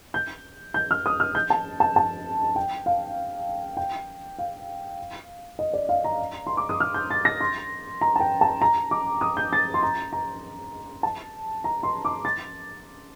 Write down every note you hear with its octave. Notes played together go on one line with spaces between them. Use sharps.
G6
G6
F6
D#6
F6
G6
A5
A5
A5
G5
F5
G5
F5
D#5
D5
F5
A#5
C6
D6
D#6
F6
G6
A6
A#6
C6
A#5
A5
G5
A5
A#5
D6
D#6
G6
A6
C6
A#5
A#5
A5
A#5
C6
D6
A6